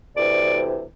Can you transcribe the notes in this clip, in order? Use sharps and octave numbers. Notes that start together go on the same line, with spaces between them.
D2 C3 E3 D5